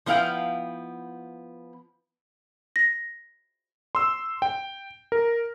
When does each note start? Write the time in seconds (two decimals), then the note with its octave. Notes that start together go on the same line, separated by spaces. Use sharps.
0.06 F3 B3 E4 F5 G5
2.76 A#6
3.95 C6 E6
4.42 G5
5.12 A#4